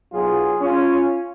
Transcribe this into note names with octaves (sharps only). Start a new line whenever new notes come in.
B1 B2 F#3 F4 G#4
C#4 F4